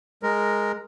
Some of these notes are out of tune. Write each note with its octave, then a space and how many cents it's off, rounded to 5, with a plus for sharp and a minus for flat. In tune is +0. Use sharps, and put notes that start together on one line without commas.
G#3 +0 A#4 +0